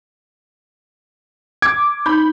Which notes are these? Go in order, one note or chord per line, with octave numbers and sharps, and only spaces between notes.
D6 G#6
D#4 B5 G6